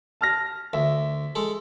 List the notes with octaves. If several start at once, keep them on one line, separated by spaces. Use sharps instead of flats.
A5 F6 A#6
D2 E5
G#3 A4